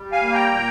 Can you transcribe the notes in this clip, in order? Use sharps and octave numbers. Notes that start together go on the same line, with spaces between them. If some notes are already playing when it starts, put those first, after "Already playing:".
Already playing: G3
F5 G#5
A#3
G5 A#5
A#2